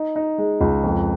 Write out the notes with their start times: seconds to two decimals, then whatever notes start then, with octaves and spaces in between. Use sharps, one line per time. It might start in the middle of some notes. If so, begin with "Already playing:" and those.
Already playing: D#4
0.16 D#4
0.38 G#3
0.61 C#2
0.84 F2